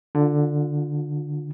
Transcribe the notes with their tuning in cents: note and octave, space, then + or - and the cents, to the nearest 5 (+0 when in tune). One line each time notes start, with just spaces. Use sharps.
D3 +5 F4 +35